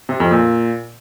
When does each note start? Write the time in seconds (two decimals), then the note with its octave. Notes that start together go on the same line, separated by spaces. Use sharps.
0.09 C3
0.20 F2
0.31 A#2